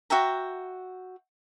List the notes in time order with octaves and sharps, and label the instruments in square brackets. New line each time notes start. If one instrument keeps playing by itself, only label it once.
[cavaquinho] F#4 E5 G5 A#5